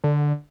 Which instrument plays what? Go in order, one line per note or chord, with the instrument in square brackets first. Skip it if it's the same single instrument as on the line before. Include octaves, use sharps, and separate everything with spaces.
[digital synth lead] D3